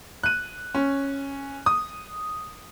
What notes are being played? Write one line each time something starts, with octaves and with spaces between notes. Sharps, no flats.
F#6 D#7
C#4
D#6